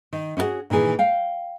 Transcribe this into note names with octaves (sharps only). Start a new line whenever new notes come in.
D#3
C#4 D#4 E4 F#4 G#4
A#2 D#3 E3 G#4
F5 G5